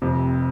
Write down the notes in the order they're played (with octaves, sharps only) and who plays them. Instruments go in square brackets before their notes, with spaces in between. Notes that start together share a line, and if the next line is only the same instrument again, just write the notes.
[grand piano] F1 F2 C3